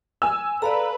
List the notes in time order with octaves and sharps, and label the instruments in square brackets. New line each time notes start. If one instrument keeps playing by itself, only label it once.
[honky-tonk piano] G#5 E6
[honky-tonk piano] A4 [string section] B4 [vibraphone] D5 F5 A#5